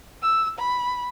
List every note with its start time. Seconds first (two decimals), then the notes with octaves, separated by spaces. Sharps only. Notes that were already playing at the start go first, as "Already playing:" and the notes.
0.22 E6
0.59 B5